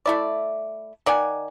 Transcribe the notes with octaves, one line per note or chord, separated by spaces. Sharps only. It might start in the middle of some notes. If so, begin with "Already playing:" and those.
A3 E4 D5
D#3 D5 F#5 G#5